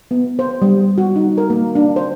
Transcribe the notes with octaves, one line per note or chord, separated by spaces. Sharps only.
B3
C5
G3
G3
F#4
D#4
A#4
A#3
D4
C5